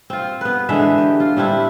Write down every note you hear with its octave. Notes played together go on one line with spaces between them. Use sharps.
C4 F4
B3 B4
D3 E3 G#3 E5
G4
F4
G3 C4 D4 E4